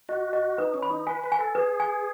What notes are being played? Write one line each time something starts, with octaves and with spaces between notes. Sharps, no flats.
F#4 D#5
D#5
D#4 B4
C#4
B5
D#4
B4 G#5
B4
G#5
A4
G#4 B4
G#5